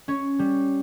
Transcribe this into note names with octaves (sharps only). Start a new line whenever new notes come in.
C#4 C#5
G3